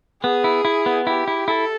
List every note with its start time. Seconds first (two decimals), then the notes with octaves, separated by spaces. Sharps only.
0.23 B3 G#4
0.44 E4
0.65 E4
0.86 B3
1.07 E4 G4
1.28 E4
1.47 E4 A4